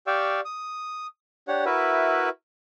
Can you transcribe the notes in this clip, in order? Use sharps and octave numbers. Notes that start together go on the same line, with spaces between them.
G4 D5 F5 G5 C#6 E6
D#6
D4 G4 C#5 F#5
E4 F#4 A#4 B4 E5